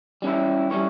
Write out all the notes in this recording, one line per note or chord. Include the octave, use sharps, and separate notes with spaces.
G3 C#4 E4
G3 C#4 E4 C#5